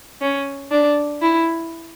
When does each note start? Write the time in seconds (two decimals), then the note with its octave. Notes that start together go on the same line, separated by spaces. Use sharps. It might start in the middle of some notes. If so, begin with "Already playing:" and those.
0.21 C#4
0.71 D4
1.22 E4